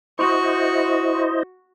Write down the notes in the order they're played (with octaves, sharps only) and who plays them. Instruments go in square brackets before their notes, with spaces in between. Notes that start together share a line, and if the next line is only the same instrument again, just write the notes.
[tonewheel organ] E4 C5 D#5 [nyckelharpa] F#4 C#6